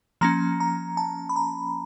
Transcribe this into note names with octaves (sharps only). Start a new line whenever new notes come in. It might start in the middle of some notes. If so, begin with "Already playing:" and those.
F3 A#3 C#4 A#5
A#5
A5
B5
A#5